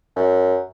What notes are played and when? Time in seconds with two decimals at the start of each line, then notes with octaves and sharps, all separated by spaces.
0.16 F#2